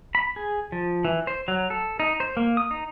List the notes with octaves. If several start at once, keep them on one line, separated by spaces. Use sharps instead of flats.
B5
G#4
F3
E3
C5
F#3
A4
D#4
C5
A#3
D#6
D#4